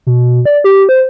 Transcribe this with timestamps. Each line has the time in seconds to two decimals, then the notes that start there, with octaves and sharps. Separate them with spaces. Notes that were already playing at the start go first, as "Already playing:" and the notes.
0.07 B2
0.45 D5
0.64 G4
0.89 C5